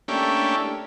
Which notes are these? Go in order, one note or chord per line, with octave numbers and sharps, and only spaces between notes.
A3 A#3 C#4 D4 E4 G4